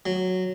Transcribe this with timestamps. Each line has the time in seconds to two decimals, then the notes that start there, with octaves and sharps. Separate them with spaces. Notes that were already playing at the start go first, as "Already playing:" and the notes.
0.06 F#3